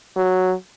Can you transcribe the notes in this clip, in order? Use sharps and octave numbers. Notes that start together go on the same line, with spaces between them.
F#3